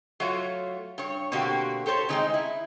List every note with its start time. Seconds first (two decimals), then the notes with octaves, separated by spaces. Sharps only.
0.20 F#3 A3 F4 F#4 C#5
0.98 G2 C#5
1.32 B2 D3 A#3 C4 F#4 G4
1.86 G4 A4 C5 C#5
2.09 D3 D#3 F#3 G#3 C4 D#4
2.34 E4